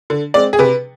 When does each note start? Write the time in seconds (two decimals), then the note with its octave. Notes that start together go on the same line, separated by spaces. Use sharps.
0.10 D3
0.34 G#3 C4 D5
0.53 G#4
0.59 C3 B4